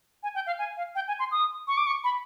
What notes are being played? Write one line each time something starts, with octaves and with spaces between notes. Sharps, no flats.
G#5
G5
F5
G#5
F5
G5
G#5
C6
D#6
C#6
D6
C#6
B5